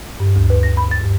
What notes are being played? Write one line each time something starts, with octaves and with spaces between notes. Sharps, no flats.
G2
D2
B4
A#6
B5
A6
G2